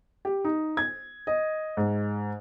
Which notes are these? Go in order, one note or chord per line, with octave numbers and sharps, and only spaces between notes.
G4
D#4
G#6
D#5
G#2